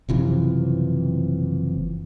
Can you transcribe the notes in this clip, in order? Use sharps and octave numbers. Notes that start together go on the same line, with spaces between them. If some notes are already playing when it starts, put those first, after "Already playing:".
F#1 C3 E3 F3